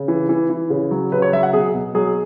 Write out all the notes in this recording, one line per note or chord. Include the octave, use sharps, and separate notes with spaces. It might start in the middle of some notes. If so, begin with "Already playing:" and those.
Already playing: C#3
E3
E3
E3
C#3
F#3
C#3 B4
C#5
F#3 E5
F#5
B2 G#4
B2
F#3 G#4